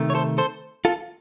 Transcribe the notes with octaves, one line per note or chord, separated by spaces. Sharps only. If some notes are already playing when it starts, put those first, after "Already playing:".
Already playing: C3 D#3 A3
C#5
A4 C5
A4 C5
F4 A4